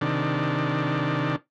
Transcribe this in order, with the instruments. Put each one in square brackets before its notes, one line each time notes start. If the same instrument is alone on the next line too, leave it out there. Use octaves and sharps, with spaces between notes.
[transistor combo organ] C3 D#3 D4